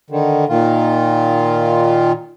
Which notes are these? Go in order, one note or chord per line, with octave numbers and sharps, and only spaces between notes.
D3 D#3
A#2 D#3 F4